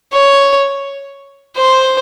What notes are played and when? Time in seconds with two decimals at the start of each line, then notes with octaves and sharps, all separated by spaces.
0.13 C#5
1.56 C5